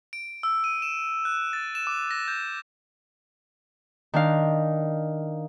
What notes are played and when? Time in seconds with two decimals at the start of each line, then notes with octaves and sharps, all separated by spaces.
0.13 D7
0.43 E6
0.64 D#7
0.82 E7
1.25 F#6
1.53 A6
1.75 E7
1.87 D6
2.11 A#6
2.28 G6
4.14 D#3 D4 F5